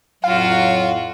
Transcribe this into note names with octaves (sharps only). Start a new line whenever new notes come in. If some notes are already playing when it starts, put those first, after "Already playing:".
F2 A2 F#3 F4 F#4 F5